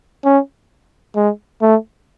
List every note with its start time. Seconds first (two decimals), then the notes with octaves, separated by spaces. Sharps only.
0.25 C#4
1.16 G#3
1.62 A3